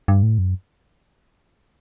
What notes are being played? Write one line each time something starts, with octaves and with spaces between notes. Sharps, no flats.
G2
A2
F#2